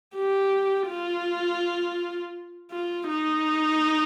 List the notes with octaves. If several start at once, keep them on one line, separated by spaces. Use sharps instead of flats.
G4
F4
F4
D#4